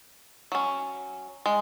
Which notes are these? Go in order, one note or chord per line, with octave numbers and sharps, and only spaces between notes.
F#3 C#4
G#3